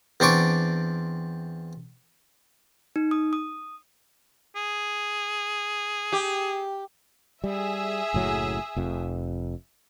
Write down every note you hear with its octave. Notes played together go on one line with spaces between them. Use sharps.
E2 C4 D4 C#6 D6
D#4
D#6
D#6
G#4
G4
G3 G#4 E5
F#1 A2 F#3
F1 F2